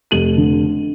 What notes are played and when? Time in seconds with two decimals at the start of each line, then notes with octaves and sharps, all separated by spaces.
0.11 F1 D#7 F#7
0.37 D3